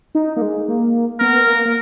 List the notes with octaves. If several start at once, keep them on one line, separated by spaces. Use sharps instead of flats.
D#4
A#3
G#3
A#3
B3 A#4
A#3
A#3